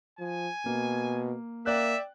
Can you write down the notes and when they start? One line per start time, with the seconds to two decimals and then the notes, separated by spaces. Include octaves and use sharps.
0.19 F3 G#5
0.66 B2 A#3
1.66 A#3 D5 E5 G5 F#6